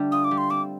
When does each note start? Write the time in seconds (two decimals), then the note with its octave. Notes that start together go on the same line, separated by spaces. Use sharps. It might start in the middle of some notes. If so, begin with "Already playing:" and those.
Already playing: D3 G3 A3
0.12 F4 D#6
0.24 D6
0.31 G3
0.38 C6
0.50 C4 D6